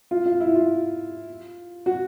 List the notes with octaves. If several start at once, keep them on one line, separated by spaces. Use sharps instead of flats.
F4
F4
E4
F4
F#4